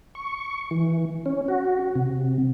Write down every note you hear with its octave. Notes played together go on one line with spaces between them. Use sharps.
C#6
E3
C#4
F#4
C3